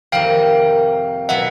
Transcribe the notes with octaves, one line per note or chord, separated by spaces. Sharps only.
F2 C3 D#3 G3 A#3 F5 G5
B2 F#3 B3 E4 E5 F#5